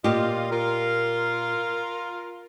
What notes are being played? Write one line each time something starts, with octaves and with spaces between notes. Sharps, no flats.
A#2 F4 G4 D#5
F4 A#4